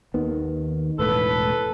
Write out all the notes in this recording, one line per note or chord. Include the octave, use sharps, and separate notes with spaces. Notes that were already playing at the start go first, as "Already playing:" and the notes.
D#2 D#3 B3
E1 A2 A4 B4